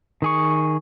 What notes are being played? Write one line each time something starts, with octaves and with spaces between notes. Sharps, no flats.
D#3 G#4 C#6